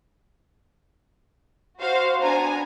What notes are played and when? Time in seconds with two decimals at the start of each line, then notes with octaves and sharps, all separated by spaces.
1.78 F#4 C5 F5
2.21 B3 D4 G#5 A#5